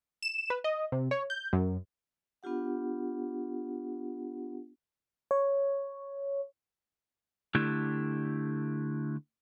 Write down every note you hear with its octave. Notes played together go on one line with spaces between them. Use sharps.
E7
B4
D#5
C3
C#5
G6
F#2
B3 D4 F4 G4 F#5
C#5
D3 A3 D4 E4 G4